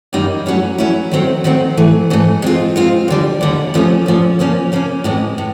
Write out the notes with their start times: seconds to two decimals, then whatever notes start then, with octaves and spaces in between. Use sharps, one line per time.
0.13 F#2 D#3 G3 A#3 D#4
0.46 F#3 A3 C#4 E4
0.78 F#3 A3 C#4 E4
1.11 D#3 F#3 A3 C4
1.44 D#3 F#3 A3 C4
1.77 G#2 E3 A3
2.10 G#2 E3 A3
2.42 G#3 C4 F4
2.76 G#3 C4 F4
3.08 D#2 D3 G3
3.41 D#2 D3 G3
3.74 A#2 F3 A3 C#4
4.06 A#2 F3 A3 C#4
4.39 C#3 F3 A#3 C#4
4.72 C#3 F3 A#3 C#4
5.04 A2 E3 G#3 C4
5.38 A2